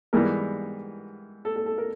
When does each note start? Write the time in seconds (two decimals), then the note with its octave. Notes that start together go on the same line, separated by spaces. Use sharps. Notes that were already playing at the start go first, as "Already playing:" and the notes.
0.13 G#2 E3 G3 B3 A#4
1.45 A4
1.56 A4
1.66 A4
1.78 A#4